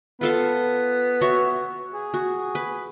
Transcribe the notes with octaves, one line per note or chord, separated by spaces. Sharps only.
B3 F4 A4 F5
F#4 C#5 E5
G#4
F#4
B4